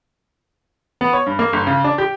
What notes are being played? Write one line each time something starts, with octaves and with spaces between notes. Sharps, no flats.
B3
C#5
G2
A#3
G1
C#3
D4
G4